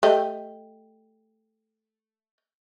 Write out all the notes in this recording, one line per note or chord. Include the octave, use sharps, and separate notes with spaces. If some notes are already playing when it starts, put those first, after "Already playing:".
A3 G4 D#5